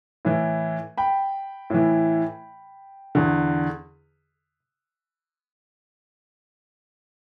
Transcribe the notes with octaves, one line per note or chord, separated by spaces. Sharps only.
A2 E3
G5 B5
A2 E3
E2 D3